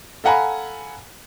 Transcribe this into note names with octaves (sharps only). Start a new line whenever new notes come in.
A4 F5 F#5 G#5 A#5 B5